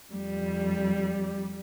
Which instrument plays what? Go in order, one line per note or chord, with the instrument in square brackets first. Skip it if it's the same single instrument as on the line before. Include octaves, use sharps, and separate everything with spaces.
[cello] F2 G3